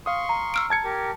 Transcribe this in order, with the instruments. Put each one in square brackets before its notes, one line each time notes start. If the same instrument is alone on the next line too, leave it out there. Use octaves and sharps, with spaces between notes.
[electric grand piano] F5 D#6 [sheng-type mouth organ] C6 C#6
[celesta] A#5
[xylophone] E6 F6 D7
[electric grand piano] A5 G#6 C#7
[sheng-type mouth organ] G4 A#4